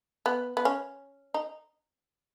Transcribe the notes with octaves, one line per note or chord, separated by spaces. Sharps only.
B3
B3
C#4
D#4